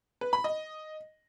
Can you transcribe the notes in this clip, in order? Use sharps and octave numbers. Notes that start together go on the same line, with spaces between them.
B4
B5
D#5